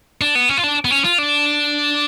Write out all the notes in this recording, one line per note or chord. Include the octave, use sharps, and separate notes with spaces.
D4
B3
C#4
F4
D4
B3
C#4
F4
D4